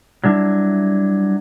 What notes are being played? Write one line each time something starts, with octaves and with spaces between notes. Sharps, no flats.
F#3 G3 D4 E4